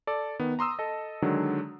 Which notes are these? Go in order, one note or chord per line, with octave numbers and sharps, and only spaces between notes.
A4 D5
D#3 B3
A#5 C6 D#6 E6
A4 D#5
D3 D#3 F#3 G#3 D4